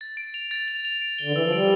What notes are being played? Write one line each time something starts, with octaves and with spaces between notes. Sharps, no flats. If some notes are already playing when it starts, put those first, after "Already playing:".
A6
D7
F7
A6
F7
F7
D7
D3 G7
E3 E6
F3
G3 D7